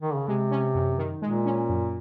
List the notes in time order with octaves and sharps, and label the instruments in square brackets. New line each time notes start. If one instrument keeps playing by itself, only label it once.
[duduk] D#3
C#3
[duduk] C3 [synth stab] G#3
[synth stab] C#4
F#2
D#3
[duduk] A#2 [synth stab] G#3
[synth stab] C#4
F#2